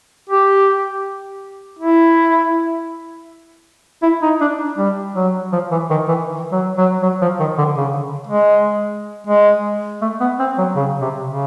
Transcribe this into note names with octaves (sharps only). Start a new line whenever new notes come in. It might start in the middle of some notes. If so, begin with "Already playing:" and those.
G4
E4
E4
D#4
D4
G3
F#3
F3
E3
D#3
E3
F#3
F#3
F#3
F3
D#3
D3
C#3
G#3
G#3
A3
B3
C4
F#3
C#3
C3
C#3